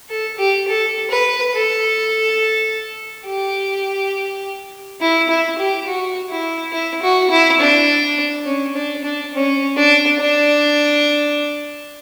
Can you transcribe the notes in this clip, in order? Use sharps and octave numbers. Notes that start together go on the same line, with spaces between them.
A4
G4
A4
B4
A4
G4
E4
E4
G4
F#4
E4
E4
F#4
E4
D4
C#4
D4
D4
C#4
D4
D4